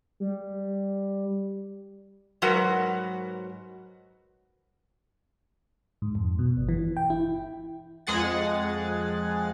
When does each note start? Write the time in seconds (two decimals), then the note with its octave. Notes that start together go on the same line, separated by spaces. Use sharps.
0.20 G3
2.42 G#2 F#3 F#4 A#4 B4 F#5
6.02 G#2
6.15 F2
6.39 B2
6.57 G1
6.69 E3
6.97 G5
7.10 E4
8.07 F2 G#3 G#4 F#5 A6